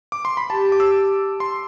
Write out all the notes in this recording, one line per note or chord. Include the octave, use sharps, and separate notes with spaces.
D6
C6
B5
G4 A5
D6
E6
C6